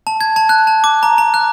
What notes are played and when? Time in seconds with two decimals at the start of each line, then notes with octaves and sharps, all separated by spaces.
0.07 A5
0.21 G#6
0.36 A5
0.49 F#6
0.67 A5
0.84 D6
1.03 A#5
1.18 A#5
1.34 F#6